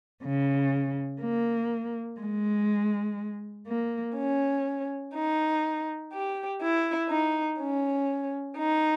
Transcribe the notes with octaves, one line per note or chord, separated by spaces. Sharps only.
C#3
A#3
G#3
A#3
C#4
D#4
G4
E4
D#4
C#4
D#4